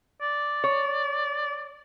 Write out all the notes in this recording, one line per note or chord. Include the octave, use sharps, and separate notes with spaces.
D5
C#5